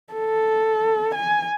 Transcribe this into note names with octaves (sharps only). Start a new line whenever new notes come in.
A4
G#5